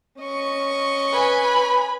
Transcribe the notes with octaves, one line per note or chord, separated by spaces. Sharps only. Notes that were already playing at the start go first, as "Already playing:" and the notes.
C#4 D#5 C#6
B4 G#5 B5